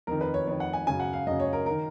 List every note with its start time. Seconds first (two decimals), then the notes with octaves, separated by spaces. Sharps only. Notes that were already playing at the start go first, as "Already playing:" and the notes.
0.07 F2 D#3 A#4
0.21 B4
0.34 C#5
0.47 F2 D#3 C#5
0.60 F#5
0.73 G#5
0.87 F#2 C#3 G#5
1.00 F#5
1.13 F5
1.26 F#2 C#3 D#5
1.40 C#5
1.53 A#4
1.66 D#3 A#4